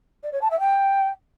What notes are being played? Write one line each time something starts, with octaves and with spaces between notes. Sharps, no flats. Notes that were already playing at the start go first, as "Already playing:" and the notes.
D5
C#5
A5
E5
G5